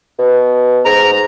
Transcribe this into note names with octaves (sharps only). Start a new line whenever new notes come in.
B2
G#2 A#5